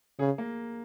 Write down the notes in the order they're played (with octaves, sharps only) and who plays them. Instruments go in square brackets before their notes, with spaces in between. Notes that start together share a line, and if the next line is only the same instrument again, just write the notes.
[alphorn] C#3 [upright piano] G#4
[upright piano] A#3